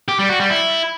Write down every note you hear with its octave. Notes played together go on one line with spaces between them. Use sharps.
G4
G3
F#4
G3
E4